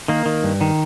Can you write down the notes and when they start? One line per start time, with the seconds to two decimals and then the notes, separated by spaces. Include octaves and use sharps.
0.08 D#3 A#3
0.26 D#3
0.43 G2
0.61 D#3